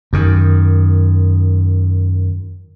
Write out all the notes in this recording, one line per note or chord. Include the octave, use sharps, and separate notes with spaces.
F#2 D#3